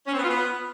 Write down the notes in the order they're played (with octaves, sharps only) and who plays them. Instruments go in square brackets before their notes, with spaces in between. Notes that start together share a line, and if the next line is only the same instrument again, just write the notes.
[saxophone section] C#4
C4
B3
F4
B3